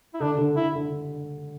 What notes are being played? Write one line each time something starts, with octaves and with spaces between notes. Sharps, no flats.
E4
D3 D4
D3
D3 E4
D3